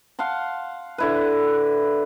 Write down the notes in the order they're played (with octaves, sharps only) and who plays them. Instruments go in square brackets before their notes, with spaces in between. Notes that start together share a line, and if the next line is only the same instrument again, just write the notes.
[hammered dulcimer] F5 F#5 A5 C6
D3 E4 B4